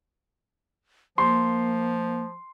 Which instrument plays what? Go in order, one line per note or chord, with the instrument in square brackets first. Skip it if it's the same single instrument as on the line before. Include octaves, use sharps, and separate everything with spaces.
[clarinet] F3 [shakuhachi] A#3 [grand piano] C6